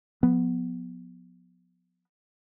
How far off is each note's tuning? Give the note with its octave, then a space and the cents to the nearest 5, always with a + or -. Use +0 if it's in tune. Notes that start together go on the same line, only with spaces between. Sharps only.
F3 +40 B3 +0